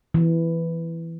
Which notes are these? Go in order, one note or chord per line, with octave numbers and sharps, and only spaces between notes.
E3